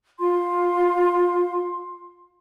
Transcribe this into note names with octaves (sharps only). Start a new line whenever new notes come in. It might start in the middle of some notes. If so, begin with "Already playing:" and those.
F4 C6